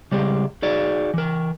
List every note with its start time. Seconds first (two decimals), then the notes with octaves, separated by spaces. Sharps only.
0.12 C#3 G3 G#3 G4
0.62 D#4 F#4 G#4 D5
1.14 E3 A#4